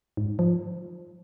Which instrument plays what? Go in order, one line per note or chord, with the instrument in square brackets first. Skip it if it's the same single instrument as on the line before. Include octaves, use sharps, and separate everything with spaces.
[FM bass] G#2
F3